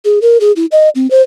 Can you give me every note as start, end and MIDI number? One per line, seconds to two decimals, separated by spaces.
0.05 0.19 68
0.22 0.38 70
0.41 0.52 68
0.56 0.66 64
0.72 0.89 75
0.95 1.09 60
1.11 1.22 72